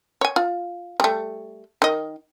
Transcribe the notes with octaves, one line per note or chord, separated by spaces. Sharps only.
C#5 G#5
F4
G3 A3
D#3 D#5